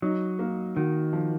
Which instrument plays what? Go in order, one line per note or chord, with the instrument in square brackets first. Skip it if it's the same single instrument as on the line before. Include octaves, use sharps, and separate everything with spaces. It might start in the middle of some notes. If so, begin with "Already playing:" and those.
[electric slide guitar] F#3 [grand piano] D#4
[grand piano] A#3
[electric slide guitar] D#3 [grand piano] F#4
[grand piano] F3